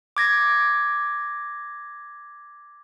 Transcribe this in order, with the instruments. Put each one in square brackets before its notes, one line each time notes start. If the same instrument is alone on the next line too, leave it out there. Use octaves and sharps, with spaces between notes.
[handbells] D6 G#6 A#6